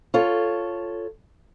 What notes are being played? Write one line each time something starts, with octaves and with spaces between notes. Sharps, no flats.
F4 A4 C#5